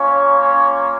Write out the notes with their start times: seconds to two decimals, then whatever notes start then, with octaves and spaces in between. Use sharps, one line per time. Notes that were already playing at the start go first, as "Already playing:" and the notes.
Already playing: A#3 C#4 F4 C#5
0.38 C#4 C#5